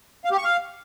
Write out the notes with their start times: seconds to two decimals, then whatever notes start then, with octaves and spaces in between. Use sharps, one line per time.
0.25 F5
0.31 G4
0.38 C#6
0.44 F5